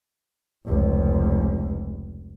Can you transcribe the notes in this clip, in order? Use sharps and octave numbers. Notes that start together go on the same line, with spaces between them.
F1 C#2